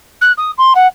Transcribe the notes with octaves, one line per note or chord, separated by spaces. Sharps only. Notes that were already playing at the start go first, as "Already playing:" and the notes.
F#6
D#6
C6
F#5